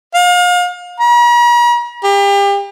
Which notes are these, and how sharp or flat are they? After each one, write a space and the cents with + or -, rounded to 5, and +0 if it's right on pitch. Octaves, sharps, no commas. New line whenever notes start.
F5 +35
A#5 +45
G4 +35